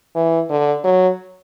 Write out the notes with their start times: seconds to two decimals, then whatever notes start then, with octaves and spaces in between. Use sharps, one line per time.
0.16 E3
0.50 D3
0.84 F#3